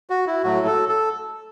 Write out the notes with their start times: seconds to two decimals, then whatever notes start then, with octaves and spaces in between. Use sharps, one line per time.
0.10 F#4
0.27 E4
0.44 A2 F#3 A3 F#4
0.67 A4
0.89 A4